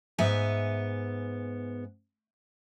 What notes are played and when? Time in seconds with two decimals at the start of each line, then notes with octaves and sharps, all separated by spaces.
0.18 G#2 B3 E5 G#5